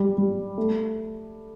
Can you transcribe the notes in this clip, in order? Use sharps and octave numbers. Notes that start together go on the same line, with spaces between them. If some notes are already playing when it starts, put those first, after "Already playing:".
Already playing: G3
G3
A3